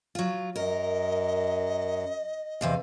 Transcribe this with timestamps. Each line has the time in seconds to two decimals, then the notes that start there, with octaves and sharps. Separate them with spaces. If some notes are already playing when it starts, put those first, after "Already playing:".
0.15 F#3 F4
0.56 F#2 A#4 D#5
2.61 E2 C3 F5